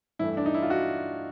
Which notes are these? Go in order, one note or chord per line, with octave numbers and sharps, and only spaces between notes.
G2 E3 A3 E4
D4
D#4
E4
F4
F#4